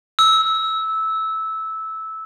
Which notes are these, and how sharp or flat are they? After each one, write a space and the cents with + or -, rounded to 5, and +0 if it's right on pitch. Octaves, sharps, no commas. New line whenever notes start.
E6 -15